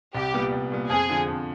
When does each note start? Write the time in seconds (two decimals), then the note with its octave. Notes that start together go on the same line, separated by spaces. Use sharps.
0.15 C2 G4
0.34 A#2 G3 B3
0.52 C2
0.72 A#2 G3 B3
0.90 F2 G#4
1.09 D3 F3
1.28 F2